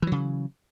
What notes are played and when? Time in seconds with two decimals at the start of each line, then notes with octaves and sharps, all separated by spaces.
0.02 E3
0.07 F#3
0.12 C#3